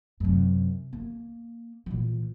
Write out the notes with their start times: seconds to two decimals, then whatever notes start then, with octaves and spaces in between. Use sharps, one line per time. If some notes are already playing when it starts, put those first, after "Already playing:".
0.20 F#2 C3
0.93 A#3
1.86 A#2 E3